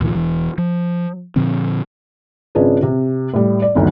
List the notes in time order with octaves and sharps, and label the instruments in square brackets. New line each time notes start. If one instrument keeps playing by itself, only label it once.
[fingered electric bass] D2 A#2 D#3 F3
E1 E3
F3
A#2 D3 F3 C4
[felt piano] G#1 C#3 D4 F4 G#4 B4
C3
A2 G3
D5
G1 D2 D#3 F#3